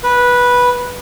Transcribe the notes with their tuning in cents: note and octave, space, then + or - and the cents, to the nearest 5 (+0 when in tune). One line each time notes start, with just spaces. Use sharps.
B4 -10